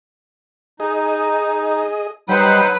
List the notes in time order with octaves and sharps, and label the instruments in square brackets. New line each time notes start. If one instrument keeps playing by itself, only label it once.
[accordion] D#4 [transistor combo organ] G#4 D#5
[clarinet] F#3 [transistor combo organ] G3 G5 B5 [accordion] D#4 C5 F#5 [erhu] B4